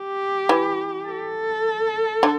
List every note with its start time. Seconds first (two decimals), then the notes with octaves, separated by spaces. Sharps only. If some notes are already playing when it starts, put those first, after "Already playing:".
Already playing: G4
0.49 E3
1.07 A4
2.23 D3